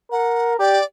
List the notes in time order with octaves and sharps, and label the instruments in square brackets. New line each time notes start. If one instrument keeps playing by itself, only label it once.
[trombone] A#4 [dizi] F#5
[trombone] G4 [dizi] D5